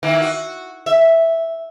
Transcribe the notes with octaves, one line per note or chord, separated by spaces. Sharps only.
D#3 E3 A#3
F#4
E5